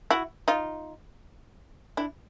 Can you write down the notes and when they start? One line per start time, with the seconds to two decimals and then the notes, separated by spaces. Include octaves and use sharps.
0.11 E4 F#4
0.48 D#4 F4
1.97 D4 E4